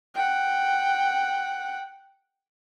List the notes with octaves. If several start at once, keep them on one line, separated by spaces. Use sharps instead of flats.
F#5 G5